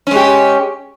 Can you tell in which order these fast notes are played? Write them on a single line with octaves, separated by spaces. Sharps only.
C#4 G#3 G4